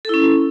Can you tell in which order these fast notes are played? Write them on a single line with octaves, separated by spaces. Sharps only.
A4 E4 C#4